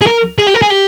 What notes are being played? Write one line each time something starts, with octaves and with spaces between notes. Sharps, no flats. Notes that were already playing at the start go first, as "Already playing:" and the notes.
G#4
A#4
G#4
G4
A#4
G#4
G4